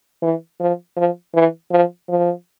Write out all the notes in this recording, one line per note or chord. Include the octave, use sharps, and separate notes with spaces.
E3
F3
F3
E3
F3
F3